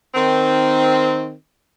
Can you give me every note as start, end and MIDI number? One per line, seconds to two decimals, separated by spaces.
0.15 1.32 51
0.15 1.32 60